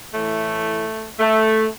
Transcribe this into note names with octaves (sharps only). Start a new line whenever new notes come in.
A2 E3 A3
A3